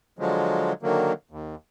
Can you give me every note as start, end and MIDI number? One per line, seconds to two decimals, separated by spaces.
0.19 0.73 50
0.19 0.73 53
0.19 0.73 54
0.19 0.73 56
0.83 1.13 50
0.83 1.13 51
0.83 1.13 54
0.83 1.13 58
1.31 1.55 39